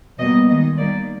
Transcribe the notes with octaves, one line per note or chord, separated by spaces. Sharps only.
B2 G3 A#3 D#5
D#3 G#3 D#5
D#3 G3 A#3 D5